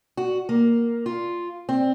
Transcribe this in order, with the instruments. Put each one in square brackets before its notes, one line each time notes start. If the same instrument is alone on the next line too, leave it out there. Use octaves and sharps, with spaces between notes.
[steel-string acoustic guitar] F#4
A#3
F4
C4